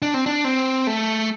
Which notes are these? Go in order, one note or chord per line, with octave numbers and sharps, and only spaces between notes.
D4
C4
D4
C4
A3